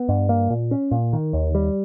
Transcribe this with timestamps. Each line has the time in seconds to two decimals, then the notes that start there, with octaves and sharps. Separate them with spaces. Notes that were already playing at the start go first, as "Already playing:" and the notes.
Already playing: B3
0.09 G2
0.29 A#3
0.50 A#2
0.71 C#4
0.91 A#2
1.13 D#3
1.33 D#2
1.55 G3